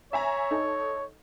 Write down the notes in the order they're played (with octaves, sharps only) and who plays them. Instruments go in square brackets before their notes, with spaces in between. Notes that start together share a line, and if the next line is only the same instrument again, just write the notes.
[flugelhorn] C#5 [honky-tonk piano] E5 G#5 A#5
[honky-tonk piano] D#4 A4